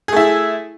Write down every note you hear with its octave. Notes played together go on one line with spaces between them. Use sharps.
A3 E4 G#4